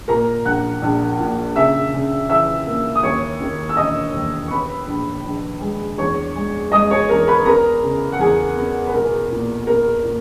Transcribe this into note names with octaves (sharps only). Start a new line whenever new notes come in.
A#2 A#4 A#5
A#1 F#5 F#6
A#1
A#2
C#3 E5 E6
C#3
E3 E5 E6
A#3
D#6
D#2 C#5 C#6
D#3
E6
E1 D#5 D#6
D#2
C#6
B3 B4 B5
A#1
A#1
G#3
E2 C#5 C#6
G#3
G#3 D#5 D#6
C#5 C#6
E2 A#4 A#5
B4 B5
B3 A#4 A#5
C#3
F#5
E2 G#4 G#5
B3
B4
B1 A#4
A#2
B3 A#4
A#2